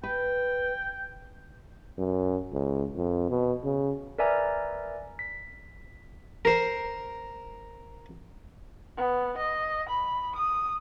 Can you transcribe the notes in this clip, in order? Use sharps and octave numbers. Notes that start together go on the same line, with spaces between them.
B4 G5
F#2
C#2
F2
B2
C#3
A#4 B4 D5 E5 G#5 A#5
B6
A#4 C5
B3
D#5
B5
D#6